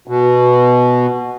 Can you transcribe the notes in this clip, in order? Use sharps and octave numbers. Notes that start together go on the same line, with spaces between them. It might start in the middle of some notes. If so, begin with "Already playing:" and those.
B2